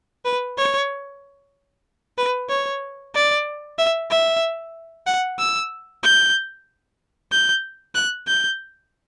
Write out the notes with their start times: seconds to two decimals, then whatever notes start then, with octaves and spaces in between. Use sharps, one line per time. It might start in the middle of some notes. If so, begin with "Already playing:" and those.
0.25 B4
0.57 C#5
2.18 B4
2.49 C#5
3.14 D5
3.78 E5
4.10 E5
5.07 F#5
5.39 E6
6.03 G6
7.32 G6
7.95 F#6
8.27 G6